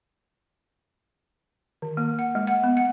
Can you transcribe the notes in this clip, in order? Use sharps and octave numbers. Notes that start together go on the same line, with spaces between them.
D#3
A#3
F#5
G#3
F#5
B3
F#5